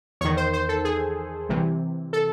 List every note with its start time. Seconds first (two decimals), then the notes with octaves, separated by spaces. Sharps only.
0.21 E2 C#5
0.25 D#3
0.37 C5
0.53 C5
0.69 A4
0.85 G#4
1.49 C2 C3 E3
2.13 A4